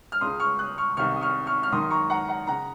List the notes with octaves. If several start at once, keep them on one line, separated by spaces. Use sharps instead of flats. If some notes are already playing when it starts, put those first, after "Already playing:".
F6
C#2 C#3 C6 D#6
C#6 F6
D#6 F#6
C#6 F6
C2 C3 D#3 C#6 F6
D#6
C#6 F6
C#6 F6
F6
F#2 D#3 C6 D#6
C6
A#5 C#6
F#5 A#5
F#5 A#5
C#3 F#5 A#5